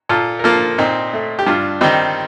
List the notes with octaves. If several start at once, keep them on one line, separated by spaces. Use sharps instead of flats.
A#2 F4 A4
A#4
F3 A#3 F4 A4
A#2 C4 D#4
A3
G4
G2 D4 F4
D#3 G3 C4 D#4